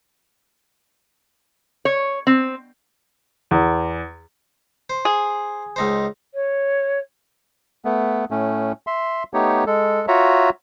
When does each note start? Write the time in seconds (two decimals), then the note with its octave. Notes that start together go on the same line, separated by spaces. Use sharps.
1.85 C#5
2.27 C4
3.51 E2
4.90 C5
5.05 G#4
5.76 C#2 D#4 C5
6.34 C#5
7.85 A3 B3
8.31 A2 A3 C#4
8.87 E5 C6
9.34 A3 B3 D#4 G4 C#5
9.67 G#3 A4
10.08 F4 F#4 C#5 E5 A#5